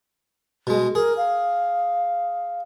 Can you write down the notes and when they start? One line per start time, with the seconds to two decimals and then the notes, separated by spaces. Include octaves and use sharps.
0.67 B2 G#3
0.95 G#4 A#4
1.17 F5